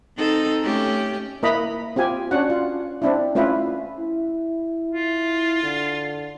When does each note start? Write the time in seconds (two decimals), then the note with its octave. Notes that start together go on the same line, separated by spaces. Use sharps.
0.17 C4 D#4 A4
0.62 A3 C#4 G4
1.43 A#3 E4 B4 D#5 A#5 B5
1.96 C4 F4 G4 G#5
2.31 C#4 D4 F#4 F#5
2.50 F4
3.02 C4 D4 E4
3.35 A3 C#4 E4 F4 B4
3.99 E4
4.92 F4
5.63 D3